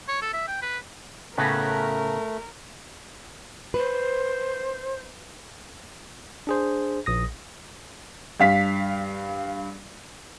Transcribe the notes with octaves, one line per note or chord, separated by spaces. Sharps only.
C#5
A4
E5
G5
B4
A2 C#3 A3 B3 C#4 F#4 A#4 B4
B4 C5
D4 G#4 C5
A#1 D#6 A#6
G2 F5 B6